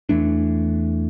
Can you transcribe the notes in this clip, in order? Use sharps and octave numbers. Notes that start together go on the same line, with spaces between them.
E2 E3 A3 D4